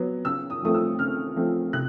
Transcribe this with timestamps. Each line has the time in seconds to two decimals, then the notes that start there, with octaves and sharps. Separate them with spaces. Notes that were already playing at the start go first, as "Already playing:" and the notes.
Already playing: F#3 B3
0.25 C#3 E6
0.50 D#6
0.62 F3 A3 C4 D#6
0.74 E6
0.99 C#3 F6
1.36 F3 A3 C4
1.73 C3 F#6